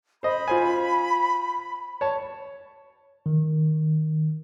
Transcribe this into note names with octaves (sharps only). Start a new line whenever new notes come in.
C5 D#5 B5
F4 C5 G#5
C#5 A5
D#3